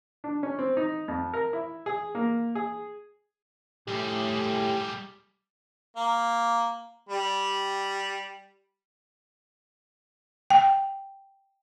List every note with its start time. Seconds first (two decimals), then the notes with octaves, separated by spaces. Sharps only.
0.24 D4
0.43 C#4
0.59 C4
0.77 D#4
1.08 F2
1.34 A#4
1.53 E4
1.86 G#4
2.15 A#3
2.55 G#4
3.88 A2 G3 G4 G#4
5.96 A#3
7.09 G3
10.50 G5